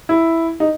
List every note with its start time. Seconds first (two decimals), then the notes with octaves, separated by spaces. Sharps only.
0.09 E4
0.60 D#4